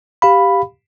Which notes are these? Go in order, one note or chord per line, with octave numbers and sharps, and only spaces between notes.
G4 F5 B5